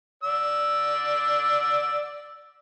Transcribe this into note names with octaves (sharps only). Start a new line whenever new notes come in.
D5 E6